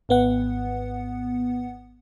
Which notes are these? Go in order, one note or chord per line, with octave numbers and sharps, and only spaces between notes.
G#1 B3 F#5